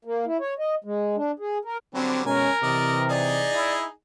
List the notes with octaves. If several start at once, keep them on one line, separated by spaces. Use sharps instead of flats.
A#3
E4
C#5
D#5
G#3
D4
G#4
A#4
D3 F#3 G3 C4
B2 G#3 C#4 A#4 G#5
C3 E3 D5 D#5
D#4 G#4 D5 D#5
E4